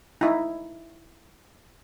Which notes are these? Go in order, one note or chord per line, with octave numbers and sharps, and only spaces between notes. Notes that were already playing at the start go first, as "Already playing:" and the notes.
D#4 E4